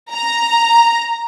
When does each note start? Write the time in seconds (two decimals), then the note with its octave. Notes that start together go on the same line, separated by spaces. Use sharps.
0.12 A#5